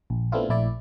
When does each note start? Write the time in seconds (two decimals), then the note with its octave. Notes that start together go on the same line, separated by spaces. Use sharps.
0.10 A#1
0.32 A3 B3 C4 D4 E4 F4
0.49 A#1 A3 E4 D5